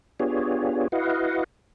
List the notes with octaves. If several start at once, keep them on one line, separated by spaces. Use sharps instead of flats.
B3 D4 F4 G4 G#4 C#5
E4 F#4 B4 D#5 F5 F#5